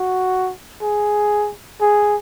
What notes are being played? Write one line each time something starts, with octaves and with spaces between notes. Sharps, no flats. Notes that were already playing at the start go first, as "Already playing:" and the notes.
Already playing: F#4
G#4
G#4